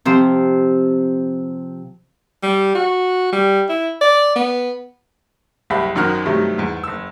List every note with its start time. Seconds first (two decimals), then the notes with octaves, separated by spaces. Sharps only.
0.05 C3 F3 C5
2.43 G3
2.75 F#4
3.33 G3
3.69 E4
4.01 D5
4.36 B3
5.70 F#1 C2 G4 E5 B5
5.95 G#1 F#2 D#3 F#4 A#4 F6
6.26 G2 C3 D#3 F#3 A3
6.58 E2 G#2
6.84 F#1 E6